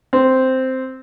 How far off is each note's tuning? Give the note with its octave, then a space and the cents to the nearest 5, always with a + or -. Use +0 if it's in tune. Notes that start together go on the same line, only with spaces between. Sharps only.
C4 -5